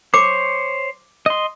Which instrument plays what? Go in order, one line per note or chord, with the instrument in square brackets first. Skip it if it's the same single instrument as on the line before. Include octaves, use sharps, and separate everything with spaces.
[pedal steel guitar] C5 C#5 [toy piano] D6
[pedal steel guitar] D#5 C6